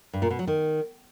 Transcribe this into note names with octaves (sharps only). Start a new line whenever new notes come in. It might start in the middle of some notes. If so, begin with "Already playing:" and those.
G2
A#2
B2
F#3
D#3